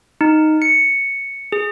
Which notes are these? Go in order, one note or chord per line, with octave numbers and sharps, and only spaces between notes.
D#4
C#7
G#4